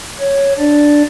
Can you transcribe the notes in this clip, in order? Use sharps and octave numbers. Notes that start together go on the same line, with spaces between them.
C#5
D4 D5